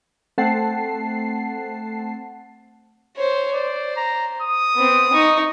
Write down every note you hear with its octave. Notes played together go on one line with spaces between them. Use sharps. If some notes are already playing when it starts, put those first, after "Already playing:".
A3 C4 F#5 A5 C7
C5 C#5
C5 D5
A#5
D#6
B3 C4
D#4 C#6